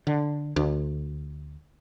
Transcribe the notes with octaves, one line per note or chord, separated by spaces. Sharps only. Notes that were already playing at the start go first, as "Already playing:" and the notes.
D3
D2